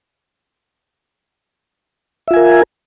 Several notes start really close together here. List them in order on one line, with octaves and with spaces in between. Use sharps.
E5 F4 G#5 A#4